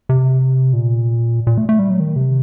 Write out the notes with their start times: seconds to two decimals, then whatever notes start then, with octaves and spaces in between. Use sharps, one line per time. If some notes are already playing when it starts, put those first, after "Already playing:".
0.09 C3
0.73 A#2
1.47 A#2
1.58 A3
1.69 A3
1.79 G3
1.90 F#3
2.00 D#3
2.16 C3